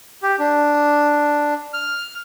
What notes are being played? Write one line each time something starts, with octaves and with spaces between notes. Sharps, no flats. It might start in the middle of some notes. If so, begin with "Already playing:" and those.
G4
D4
F6